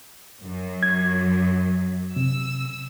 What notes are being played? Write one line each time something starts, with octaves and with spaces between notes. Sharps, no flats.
F#2 F#3
G#6
C3 E6